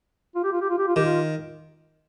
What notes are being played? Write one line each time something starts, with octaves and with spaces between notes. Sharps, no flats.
F4
G4
F4
G4
F4
G4
F4
D#3 G4
F4